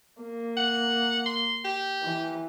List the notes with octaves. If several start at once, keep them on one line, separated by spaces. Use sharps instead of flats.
A#3
F#5
C6
G4
E3